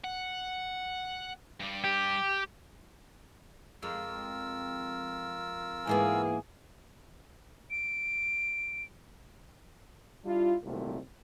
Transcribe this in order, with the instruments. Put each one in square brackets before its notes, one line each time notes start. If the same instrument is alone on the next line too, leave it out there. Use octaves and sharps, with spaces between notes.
[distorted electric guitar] F#5
G2 G3
[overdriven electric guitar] G4
[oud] F2 G#3 [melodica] F4 A#4 E6
[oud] G#2 A#3 B3 [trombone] E3 [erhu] G#4
[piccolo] D7
[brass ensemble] G3 D4 E4 F4
C2 F#2 A#2 D#3 A3 C4